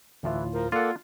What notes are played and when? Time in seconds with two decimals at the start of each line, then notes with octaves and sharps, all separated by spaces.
0.23 D2 A2 E3 F4
0.53 F3 A#4
0.72 A#3 F4 A4 D5 F#5